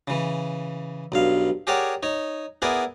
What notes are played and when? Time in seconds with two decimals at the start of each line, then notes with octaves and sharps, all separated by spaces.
0.08 C#3 E3
1.12 B1 G2 F5
1.67 G4 G#4 A#4 C#5 D5 F#5
2.03 D#4 C#5
2.62 B3 E4 G#4 A#4 D5 F#5